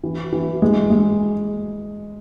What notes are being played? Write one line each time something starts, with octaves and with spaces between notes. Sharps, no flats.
E3
E3
G#3
G#3